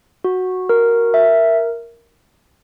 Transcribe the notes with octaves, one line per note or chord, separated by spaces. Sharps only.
F#4
A#4
E5